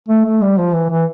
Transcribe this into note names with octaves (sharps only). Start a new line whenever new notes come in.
A3
A3
G3
F3
E3
E3